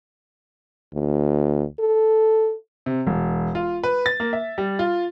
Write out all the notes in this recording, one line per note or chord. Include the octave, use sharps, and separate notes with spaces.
D2
A4
C3
E1
F4
B4
A6
A#3
E5
G3
F4